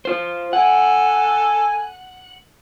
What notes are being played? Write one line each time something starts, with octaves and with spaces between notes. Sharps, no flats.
F4 C5
A4 F#5 G#5